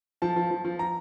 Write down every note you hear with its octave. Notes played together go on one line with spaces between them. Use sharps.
F3 A5
F3
F3
F3
A#5